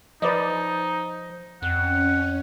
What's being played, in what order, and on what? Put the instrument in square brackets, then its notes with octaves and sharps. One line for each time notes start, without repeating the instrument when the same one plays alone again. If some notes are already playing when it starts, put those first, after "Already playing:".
[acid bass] F3 [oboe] D#4 [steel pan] B4 D5 D#5
[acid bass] F2 [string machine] C#4 [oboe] F#5